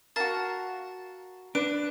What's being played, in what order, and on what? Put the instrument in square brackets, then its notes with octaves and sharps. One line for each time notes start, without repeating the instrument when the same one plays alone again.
[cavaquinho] F#4 A#4 [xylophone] F5 A5 A6
[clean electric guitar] D4 [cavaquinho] B4 [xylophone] D7